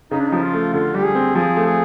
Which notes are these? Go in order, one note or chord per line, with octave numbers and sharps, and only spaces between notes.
C#3 D#4
D4
F3 D#4
F4
A3
D3 F4
G3 G4
G#4
C4
F3 G#4
A3
G#4